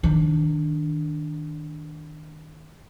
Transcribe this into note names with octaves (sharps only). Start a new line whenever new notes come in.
D#3 D4